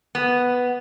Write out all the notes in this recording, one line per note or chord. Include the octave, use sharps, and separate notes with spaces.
B3